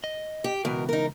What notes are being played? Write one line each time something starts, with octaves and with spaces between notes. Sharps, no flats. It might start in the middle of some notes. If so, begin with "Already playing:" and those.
D#5
G4
C#2 B2 E3 A#4
D#4 A#4